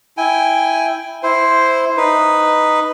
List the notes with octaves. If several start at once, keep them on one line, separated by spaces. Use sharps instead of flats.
E4 G5 G#5
E4 C5
D#4 B4